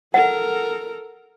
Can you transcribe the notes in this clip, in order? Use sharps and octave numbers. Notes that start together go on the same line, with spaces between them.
A4 A#4 F#5